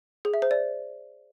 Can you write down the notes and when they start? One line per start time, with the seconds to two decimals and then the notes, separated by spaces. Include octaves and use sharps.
0.25 G#4
0.34 E5
0.42 C5
0.51 D5